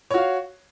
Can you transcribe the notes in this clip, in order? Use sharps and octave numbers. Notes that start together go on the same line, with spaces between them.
F#4 C#5 F5